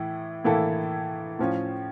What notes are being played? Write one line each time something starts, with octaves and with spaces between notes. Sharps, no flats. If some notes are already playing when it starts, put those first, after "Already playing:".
Already playing: A2 E3 E4
A2 E3 A#3 E4 A4
A2 F3 C#4